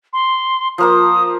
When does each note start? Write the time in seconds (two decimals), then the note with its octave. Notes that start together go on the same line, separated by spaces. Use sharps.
0.13 C6
0.78 F3 A#3 C5 D#6